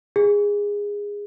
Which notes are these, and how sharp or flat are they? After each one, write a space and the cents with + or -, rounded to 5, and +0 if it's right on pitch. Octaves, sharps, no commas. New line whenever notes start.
G#4 -20